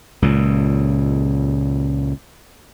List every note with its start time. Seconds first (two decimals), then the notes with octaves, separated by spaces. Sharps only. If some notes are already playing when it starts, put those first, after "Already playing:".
0.22 C#2 A#2